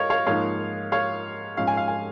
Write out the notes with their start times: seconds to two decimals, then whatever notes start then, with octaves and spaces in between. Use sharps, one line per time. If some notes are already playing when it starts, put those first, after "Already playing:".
Already playing: G#2 A#4 C#5 D#5 F5
0.10 C#5 F5
0.26 G#2 F3 A#3 D#4 C#5 F5
0.92 C#5 F5
1.57 G#2 F3 C#4 F5
1.67 G#5
1.77 F5
1.88 G#5